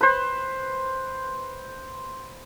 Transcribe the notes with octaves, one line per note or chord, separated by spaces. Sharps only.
B4 C5